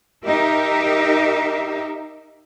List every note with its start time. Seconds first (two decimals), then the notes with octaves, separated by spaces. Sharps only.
0.24 D#4 G4 A#4 E5